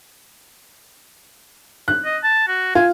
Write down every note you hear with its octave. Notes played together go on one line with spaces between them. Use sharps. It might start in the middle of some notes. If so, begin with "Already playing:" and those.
F#6
D#5
A5
F#4
F4 G#5